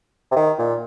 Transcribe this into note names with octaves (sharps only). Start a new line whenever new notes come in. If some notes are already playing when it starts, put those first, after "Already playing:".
C3
D#3
A#2